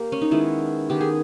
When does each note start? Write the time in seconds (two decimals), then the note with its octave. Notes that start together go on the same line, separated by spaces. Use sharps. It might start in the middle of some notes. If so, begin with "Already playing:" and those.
Already playing: A#3 G4
0.12 C#4
0.21 D#4
0.31 D#3 G#3 B3 E4
0.89 D#3 G#3 B3 G4
1.01 G#4